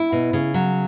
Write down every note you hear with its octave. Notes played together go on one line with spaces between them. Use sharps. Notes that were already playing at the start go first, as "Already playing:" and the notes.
Already playing: E4
B2
C#3
F#3